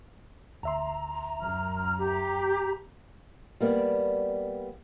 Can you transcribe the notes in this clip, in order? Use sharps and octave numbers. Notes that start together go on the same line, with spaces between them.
D2 E5 A#5 C6
F#2 F6
G4
G3 A#3 B3 D5